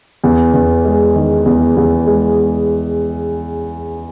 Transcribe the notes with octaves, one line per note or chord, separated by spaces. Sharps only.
E2
E2
G#3
D#3
E2
E2
G#3